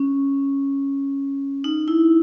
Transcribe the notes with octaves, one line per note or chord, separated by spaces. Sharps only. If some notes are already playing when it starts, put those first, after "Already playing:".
Already playing: C#4
D#4
E4